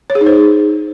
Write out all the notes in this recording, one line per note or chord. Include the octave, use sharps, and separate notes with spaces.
C#5
G#4
D#4
C5